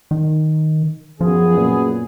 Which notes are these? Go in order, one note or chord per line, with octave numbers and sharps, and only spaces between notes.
D#3
F#2 F3 B3 G#4
A#2